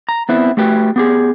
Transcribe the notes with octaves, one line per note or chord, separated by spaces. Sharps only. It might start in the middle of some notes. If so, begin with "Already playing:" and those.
A#5
B3 C4 E4 B4
A3 F#4 G4 B4
B3 G4 G#4